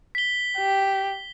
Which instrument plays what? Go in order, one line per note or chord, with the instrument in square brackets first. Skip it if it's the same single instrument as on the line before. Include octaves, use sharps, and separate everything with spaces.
[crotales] B6 G7
[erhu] G4